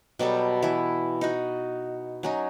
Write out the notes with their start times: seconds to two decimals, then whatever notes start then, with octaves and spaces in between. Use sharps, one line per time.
0.19 B2 F#3 G3 A4
0.63 E3 E4
1.21 D#4 F#4
2.23 F#3 C#4 D#4